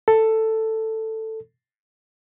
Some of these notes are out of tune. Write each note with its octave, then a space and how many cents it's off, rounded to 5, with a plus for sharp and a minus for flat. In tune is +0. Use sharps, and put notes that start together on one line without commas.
A4 +10